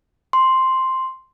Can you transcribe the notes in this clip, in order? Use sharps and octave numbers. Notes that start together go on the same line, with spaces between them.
C6